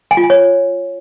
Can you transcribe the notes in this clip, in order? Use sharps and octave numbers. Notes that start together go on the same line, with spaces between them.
G#5
F4
G#5
C#5